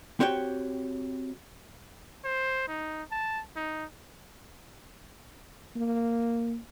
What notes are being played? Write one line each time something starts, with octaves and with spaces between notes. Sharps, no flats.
C4 F#4 G4 C#5 G5
C5
D#4
A5
D#4
A#3